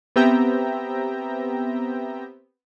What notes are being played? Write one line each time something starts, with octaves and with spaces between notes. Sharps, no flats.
B3 C4 G4 E5 G5 A#5